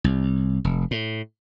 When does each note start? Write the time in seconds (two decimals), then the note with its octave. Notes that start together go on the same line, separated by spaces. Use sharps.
0.04 C2
0.65 F1
0.91 A2